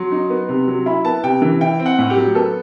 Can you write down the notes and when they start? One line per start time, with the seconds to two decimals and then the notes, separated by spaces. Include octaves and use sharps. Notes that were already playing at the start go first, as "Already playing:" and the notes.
Already playing: F#3 C6
0.12 D#4
0.30 B3
0.49 C3
0.68 F#3
0.86 E4 B5
1.05 B3 A5
1.23 C3 G5
1.42 E3
1.61 E4 G5
1.80 C4
1.86 F#5
1.99 A2
2.10 G4
2.17 F#3
2.35 B3 A4